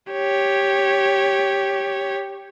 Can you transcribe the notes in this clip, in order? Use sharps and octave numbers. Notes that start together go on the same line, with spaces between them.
G4 C#5